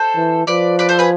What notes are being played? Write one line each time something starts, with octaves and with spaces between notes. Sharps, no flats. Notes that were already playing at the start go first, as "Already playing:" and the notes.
Already playing: A4 C5
E3
F3 B4 D5
B4 D5
A4 C5
G#4 B4